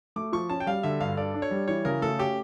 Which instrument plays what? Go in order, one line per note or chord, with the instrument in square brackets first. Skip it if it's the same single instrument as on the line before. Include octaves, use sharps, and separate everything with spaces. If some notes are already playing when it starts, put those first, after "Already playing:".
[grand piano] A3 [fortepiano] D6
[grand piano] F3 [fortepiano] C#6
[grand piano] C#4 [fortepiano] A5
[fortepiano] G5
[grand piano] G3 [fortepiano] F5
[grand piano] D3 [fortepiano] E5
[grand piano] G2 [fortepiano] F5
[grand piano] A4 [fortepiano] D5
[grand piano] D4
[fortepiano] C#5
[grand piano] G3
[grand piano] E3 [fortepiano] C#5
[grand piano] C#3 [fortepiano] A#4
[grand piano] A3 [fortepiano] A4
[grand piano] C#4 [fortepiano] G4